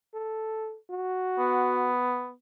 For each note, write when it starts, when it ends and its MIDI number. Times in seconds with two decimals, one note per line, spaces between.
0.14 0.77 69
0.90 1.93 66
1.39 2.31 59